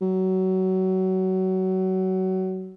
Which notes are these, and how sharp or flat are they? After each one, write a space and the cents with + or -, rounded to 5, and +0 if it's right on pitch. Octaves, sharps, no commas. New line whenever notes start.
F#3 +25